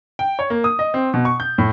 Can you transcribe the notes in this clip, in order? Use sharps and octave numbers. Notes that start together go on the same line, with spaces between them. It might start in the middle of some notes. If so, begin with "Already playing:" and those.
G5
C#5
A#3
D#6
D#5
C4
B2
C#6
G6
A2